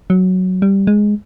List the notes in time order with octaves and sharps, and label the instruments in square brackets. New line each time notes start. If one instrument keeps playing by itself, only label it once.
[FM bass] F#3
G3
G#3